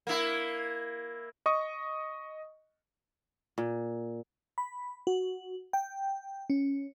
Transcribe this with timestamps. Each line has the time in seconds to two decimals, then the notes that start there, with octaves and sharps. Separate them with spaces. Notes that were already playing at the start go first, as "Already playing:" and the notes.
0.07 A#3 E4
1.46 D#5 C#6 D#6
3.58 A#2
4.58 B5
5.07 F#4
5.73 G5
6.50 C#4